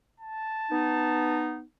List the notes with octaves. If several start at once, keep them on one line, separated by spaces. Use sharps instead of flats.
A5
B3 D#4